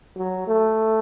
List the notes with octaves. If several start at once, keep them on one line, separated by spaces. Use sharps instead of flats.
F#3
A3